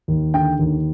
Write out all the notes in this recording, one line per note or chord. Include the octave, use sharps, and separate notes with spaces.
D#2
D3 G5
D#2